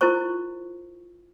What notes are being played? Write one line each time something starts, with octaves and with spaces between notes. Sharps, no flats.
E4 F4 A#4 C5 C#6